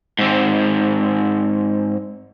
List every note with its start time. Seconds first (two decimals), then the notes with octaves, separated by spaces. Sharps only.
0.19 G#2 C4